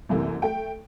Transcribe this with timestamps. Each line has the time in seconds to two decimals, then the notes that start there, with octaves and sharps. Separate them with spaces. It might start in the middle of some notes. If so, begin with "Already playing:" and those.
0.09 C2 F#2 C3 E3 A3 A#3
0.42 A3 G5